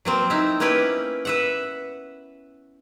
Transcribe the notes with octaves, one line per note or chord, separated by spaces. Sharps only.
F#3 A#3 C4
D#4 E4
A#3 B3 C#4 E4 G4 B4
B4 E5 F#5